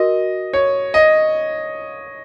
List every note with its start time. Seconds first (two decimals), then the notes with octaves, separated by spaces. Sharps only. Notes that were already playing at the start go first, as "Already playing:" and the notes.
Already playing: F#4 A#4 D#5
0.53 C#5
0.94 D#5